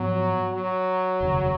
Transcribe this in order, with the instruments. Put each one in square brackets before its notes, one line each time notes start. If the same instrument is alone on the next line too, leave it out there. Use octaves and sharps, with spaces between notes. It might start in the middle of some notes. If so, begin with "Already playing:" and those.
Already playing: [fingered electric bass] G#2 F3 B3 [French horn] F#3
[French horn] F#3
[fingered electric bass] F1 D#2 C#3